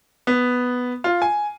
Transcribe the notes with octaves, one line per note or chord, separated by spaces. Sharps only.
B3
F4
G#5